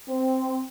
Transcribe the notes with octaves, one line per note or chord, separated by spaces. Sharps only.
C4